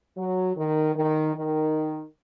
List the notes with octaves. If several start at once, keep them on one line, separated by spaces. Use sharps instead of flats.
F#3
D#3
D#3
D#3